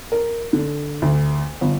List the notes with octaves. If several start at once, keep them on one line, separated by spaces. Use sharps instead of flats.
A#4
D3
D2
G1